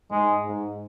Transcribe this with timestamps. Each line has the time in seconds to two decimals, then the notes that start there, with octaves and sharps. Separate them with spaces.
0.11 G#2 G#3
0.45 G#2